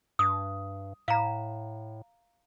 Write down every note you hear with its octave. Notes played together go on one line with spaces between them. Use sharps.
G2 D#6
A2 F5 A#5